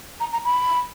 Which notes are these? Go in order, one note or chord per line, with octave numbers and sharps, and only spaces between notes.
A#5
A#5
B5